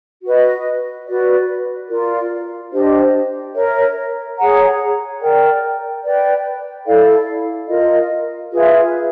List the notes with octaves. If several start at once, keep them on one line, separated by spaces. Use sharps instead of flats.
F#4 B4 D#5
F#4 B4 D5
F4 A#4 D5
D4 G4 C5 D#5
A#4 C#5 E5
G#4 C#5 F#5 A#5
A#4 D5 G5
B4 D5 G5
E4 A4 D5 F5
F4 A#4 D#5
F4 G#4 B4 E5